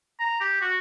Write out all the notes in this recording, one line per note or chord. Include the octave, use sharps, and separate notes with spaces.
A#5
G4
F#4